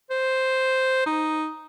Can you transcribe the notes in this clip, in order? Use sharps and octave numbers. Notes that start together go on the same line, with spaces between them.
C5
D#4